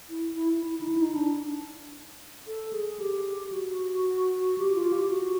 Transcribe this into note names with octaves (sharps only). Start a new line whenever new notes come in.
E4
E4
E4
D#4
E4
D#4
D4
A4
G#4
G4
F#4
G4
F4
G4
F#4